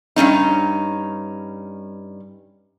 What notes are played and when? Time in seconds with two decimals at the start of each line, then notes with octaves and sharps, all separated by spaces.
0.16 G2 C3 C#4 D#4